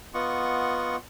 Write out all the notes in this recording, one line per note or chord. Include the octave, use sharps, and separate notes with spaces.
B3 F4 D#5 F#5 C#6